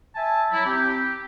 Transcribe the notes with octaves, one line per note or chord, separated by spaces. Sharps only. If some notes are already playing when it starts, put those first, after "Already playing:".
E5 G#5 A5
F#3 E4
C4 G4